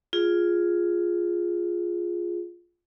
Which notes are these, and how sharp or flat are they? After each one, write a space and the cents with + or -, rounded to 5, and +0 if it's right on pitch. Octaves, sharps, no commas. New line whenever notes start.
F4 +0 G#4 +0